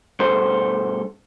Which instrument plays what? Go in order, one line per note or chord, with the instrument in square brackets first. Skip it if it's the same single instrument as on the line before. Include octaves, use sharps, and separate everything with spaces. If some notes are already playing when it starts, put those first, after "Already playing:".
[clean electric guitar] G2 B2 A4 C5